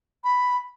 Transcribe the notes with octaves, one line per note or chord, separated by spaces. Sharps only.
B5